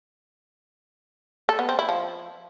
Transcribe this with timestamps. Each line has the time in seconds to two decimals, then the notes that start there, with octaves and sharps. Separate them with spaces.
1.49 A4
1.59 B3
1.69 C4
1.79 E4
1.89 F3